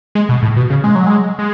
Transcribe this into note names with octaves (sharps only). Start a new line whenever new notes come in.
G#3
B2
A2
B2
C#3
G#3
F#3
G#3
G#3